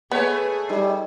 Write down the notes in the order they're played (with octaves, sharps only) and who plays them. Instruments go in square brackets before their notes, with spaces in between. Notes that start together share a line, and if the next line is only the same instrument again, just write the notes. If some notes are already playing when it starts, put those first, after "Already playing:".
[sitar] A3 B4 C#5 [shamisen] B3 [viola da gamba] G#4
[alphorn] G3 [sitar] D#4